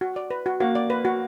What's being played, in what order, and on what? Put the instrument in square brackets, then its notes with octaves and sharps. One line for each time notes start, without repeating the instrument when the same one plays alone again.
[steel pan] F#4
D5
B4
F#4
[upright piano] A#3 [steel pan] F#4
[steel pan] D5
B4
F#4